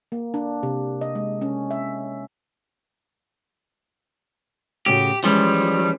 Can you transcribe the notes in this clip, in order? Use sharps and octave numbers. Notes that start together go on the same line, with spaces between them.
A#3
D4
C3
D#5
G#3
C#4
E5
A2 C#3 F#4 G4
E3 F3 G3 G#3 C#4